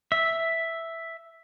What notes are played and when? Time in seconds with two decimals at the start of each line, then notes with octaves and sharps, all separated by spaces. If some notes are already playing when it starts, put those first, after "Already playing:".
0.12 E5